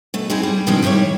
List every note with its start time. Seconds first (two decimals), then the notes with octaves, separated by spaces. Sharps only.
0.14 B2 A3
0.30 C4 D#4 E4 G#4
0.43 G3
0.67 B2 D#3 F3 G#3 C4 D4
0.83 D#3 G3 E4 C5 C#5